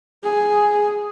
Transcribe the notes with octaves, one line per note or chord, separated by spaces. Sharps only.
G#4